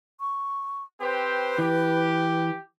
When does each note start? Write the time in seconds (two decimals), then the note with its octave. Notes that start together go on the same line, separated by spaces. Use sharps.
0.20 C#6
1.01 C4 G4 B4 C5
1.58 E3 G4